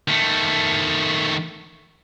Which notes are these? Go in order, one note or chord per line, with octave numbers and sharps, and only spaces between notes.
D#3 A3